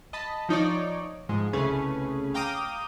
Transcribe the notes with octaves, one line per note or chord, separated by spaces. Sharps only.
D#5 A5 B5
F3 D#4 C#5 D5
G#2 F3 G#3
C2 C#3 A3 C#4 G#4 B4
F5 G5 A#5 D6 D#6